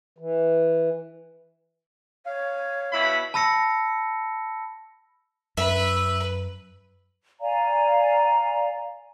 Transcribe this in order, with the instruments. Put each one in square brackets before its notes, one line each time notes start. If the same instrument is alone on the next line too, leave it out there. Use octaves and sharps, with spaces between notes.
[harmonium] E3
[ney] C#5 [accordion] F5
[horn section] B2 E4 B5
[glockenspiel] A5 B5 E6 A#6 C#7
[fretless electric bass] F#2 [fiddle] B4 [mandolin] E5
[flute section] D5 F5 G#5 A#5